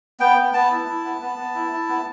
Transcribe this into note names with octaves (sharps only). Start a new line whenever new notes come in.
B3 G5
B3
B3 A5
E4
E4
B3
B3
B3
E4
E4
B3